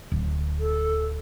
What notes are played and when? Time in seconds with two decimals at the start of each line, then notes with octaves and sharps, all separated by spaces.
0.12 D1
0.59 A4